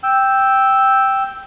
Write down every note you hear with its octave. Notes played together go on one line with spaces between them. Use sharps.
G5 E6